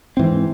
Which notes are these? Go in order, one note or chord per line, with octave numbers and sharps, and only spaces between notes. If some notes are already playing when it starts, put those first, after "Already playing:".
G#2 E3 C4